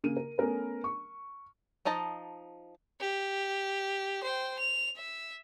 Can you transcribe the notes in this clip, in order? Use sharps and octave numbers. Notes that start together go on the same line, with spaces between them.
C#3 A#3 D#7
A#4
A3 B3 C#4 A#4 B4
C#6
F3 D#4 D#5 A5
G4
C5 G5
F7
E5